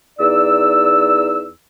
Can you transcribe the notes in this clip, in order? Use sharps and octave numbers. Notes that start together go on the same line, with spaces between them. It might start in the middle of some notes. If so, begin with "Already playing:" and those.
E2 D#4 D5 E6